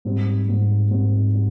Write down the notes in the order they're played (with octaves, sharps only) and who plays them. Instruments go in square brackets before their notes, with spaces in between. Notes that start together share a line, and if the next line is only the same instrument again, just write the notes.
[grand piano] G#2 G3 C4
G#2 G3 C4
G#2 G3 C4
G3